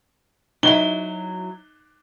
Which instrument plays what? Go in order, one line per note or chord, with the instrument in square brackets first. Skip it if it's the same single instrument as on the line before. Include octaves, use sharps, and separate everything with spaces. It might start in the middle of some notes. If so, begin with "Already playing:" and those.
[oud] F#3 E4 [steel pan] D#4 [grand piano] G7